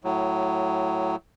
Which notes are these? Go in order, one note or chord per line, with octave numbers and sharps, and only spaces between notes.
A2 F#3